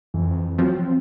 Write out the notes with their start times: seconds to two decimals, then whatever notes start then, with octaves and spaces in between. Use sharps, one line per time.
0.14 F2 E3
0.58 F3 F#3 C4